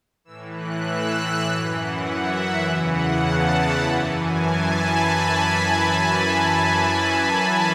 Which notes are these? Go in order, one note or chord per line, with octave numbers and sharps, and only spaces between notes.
A2 E3 E6
F#6
E6
E6
F#2 E3 G#5
F#5
E5
E2 C#3 E3
F#5
A5
B5
F#2 E3 D6
G#5
A5
B5